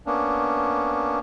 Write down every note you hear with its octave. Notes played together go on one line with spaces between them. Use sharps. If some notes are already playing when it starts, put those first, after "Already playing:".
A#3 B3 C#4 D4